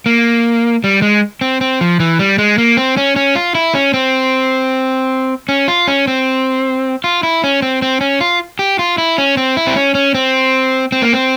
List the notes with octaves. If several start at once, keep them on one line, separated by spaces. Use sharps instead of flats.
A#3
G3
G#3
C4
C4
F3
E3
G3
G#3
A#3
C4
C#4
C#4
F4
E4
C#4
C4
C#4
F4
C#4
C4
F4
E4
C#4
C4
C4
C#4
F4
G4
F4
E4
C#4
C4
E4
C4
C#4
C#4
C4
C4
A#3
C4